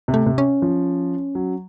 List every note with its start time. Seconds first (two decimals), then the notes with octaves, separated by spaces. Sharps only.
0.08 C3
0.14 A3
0.26 C3
0.38 C#4
0.62 F3
1.35 F#3